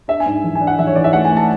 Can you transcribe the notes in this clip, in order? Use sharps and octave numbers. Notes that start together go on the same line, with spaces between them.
D4 E5
G#5
G#2
E3
G#5
D4
F#5
E3 E5
C#5
E3 D5
E5
A3 F#5
G#5
A3 A5